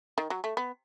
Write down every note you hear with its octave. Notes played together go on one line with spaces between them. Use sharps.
D#3
F#3
A3
B3